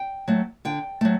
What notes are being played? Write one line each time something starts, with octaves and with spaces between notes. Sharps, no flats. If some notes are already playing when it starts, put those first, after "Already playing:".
Already playing: G5
F#3 A3
D3 G5
F#3 A3